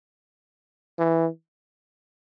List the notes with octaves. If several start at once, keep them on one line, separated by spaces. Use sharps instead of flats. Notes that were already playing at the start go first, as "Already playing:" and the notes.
E3